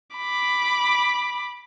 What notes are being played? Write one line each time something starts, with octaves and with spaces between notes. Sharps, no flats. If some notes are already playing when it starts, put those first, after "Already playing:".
B5 D6